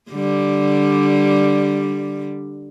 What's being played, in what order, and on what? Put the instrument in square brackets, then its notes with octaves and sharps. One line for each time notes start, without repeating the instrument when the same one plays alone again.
[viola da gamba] D3 G3